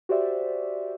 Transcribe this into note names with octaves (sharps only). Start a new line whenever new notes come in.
F#4 G4 C5 D5 E5